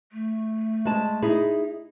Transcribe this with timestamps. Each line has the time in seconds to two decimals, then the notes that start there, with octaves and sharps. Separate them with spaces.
0.12 A3
0.85 G#3 A5
1.22 D#4 E4 G#4